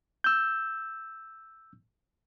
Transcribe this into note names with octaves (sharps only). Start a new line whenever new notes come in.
E6 G6